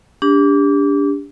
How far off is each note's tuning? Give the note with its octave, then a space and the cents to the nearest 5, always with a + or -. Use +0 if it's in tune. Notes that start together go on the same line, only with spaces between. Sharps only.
D4 -25 G4 +30